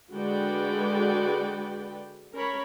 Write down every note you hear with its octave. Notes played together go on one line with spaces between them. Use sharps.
D3 G#3 F#4 B4 D5 G5
C#4 A#4 C#5 B5